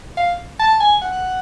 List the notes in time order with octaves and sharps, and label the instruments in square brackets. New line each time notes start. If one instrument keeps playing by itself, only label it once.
[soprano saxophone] F5
A5
G#5
F#5